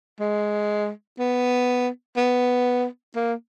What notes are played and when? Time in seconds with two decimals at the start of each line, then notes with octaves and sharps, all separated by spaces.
0.20 G#3
1.19 B3
2.17 B3
3.15 A#3